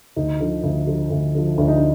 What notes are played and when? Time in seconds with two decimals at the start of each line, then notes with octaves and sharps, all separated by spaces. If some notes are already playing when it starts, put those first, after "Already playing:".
0.16 D2 D#4
0.40 D3 F3
0.63 D2
0.87 D3 F3
1.10 D2
1.35 D3 F3
1.58 D2 D4
1.68 D#4
1.78 D4